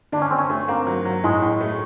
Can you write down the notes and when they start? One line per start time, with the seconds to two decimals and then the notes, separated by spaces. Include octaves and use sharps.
0.12 D3 D4
0.22 C#4
0.31 D3 C4
0.38 C#4
0.50 A3
0.68 A#3 C4
0.87 F#3
1.05 F#3
1.24 A2 G#3
1.42 A2
1.61 A3